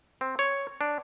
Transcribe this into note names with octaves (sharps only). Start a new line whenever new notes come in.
C4
C#5
D4